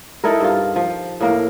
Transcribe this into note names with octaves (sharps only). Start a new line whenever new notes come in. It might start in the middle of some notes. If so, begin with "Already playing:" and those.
D#4 E4 A4 A#4
G2 F4
F3
A2 A#3 A#4